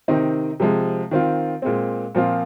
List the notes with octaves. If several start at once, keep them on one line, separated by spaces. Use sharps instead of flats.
C3 D#3 C4 D#4
C3 F3 G#3
D#3 C4 F4
A#2 G#3 C4
A#2 F3 C4 F4